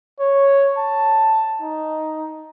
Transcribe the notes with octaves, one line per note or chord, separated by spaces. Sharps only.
C#5
A5
D#4